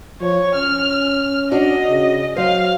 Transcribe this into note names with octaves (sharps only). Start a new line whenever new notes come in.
F3 C#5
C#4 F6
D4 F#4 D5 D#5
C#3
F#3 C5 F5